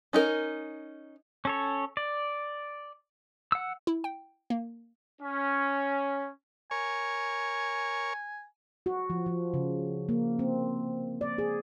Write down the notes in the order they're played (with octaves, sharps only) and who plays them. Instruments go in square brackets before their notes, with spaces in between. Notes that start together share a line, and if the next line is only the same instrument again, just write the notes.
[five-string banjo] C#4 D#4 F4 A#4
[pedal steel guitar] C#4 A4 C#5
D5
F#5 E6
[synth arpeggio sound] E4
G5
A#3
[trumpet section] C#4
[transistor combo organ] A#4 C#5 C#6 [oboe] G#5
[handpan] F#4
F3
F3
C#3
A#3
C4
D5
G#4